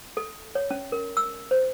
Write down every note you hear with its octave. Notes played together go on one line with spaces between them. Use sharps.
A4
C#5
C#4
A#4
E6
C5